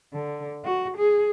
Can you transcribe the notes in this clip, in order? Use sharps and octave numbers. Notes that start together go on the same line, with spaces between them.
D3
F#4
G#4